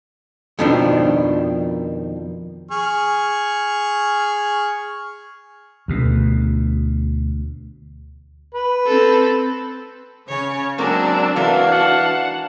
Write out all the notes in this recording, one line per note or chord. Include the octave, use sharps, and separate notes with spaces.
F2 B2 D#3 F3 D4
G#4 C#6 F6
D2 B2
B4
C4 A4
C#3 C#4 C#5
F#3 G#3 A#3 C4 D4 A#4 E6
E3 D4 F#4 A#4 B4 F5
F#5 A5